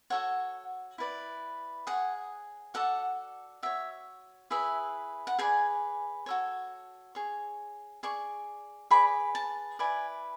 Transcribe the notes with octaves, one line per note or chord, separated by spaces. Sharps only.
F#4 A4 C#5 F#5
E4 B4 D5
G#4 C#5 F#5
F#4 A4 D5 F#5
F#4 C#5 E5
E4 G#4 B4 E5
F#5
G#4 B4 D5 G#5
F#4 A4 C#5
G#4 C#5
G#4 D5 C#6
G#4 B4 D5 B5
A5
E4 B4 D5 G#5